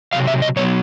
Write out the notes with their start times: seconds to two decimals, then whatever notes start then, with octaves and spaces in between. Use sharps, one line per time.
0.13 C3 D#3 F#3 F5
0.27 E5
0.42 D#5
0.56 B2 F#3 B3 C#5